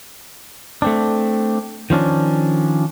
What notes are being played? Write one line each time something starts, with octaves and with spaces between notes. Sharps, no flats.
A3 C4 D4
D#3 F3 C#4 D4